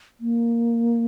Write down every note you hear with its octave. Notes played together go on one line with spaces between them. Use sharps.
A#3